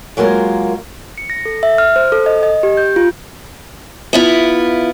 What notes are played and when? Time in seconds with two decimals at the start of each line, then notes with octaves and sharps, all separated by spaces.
0.17 F#3 G#3 A#3 F4 A#4
1.18 C#7
1.30 A#6
1.45 A4
1.63 E5
1.78 F6
1.96 C5
2.12 A4
2.26 D#5
2.43 D#5
2.63 G4
2.77 G6
2.96 F4
4.13 B3 E4 F4